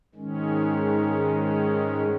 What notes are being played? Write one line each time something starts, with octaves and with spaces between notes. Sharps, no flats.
G#2 D#3 G#3 C#4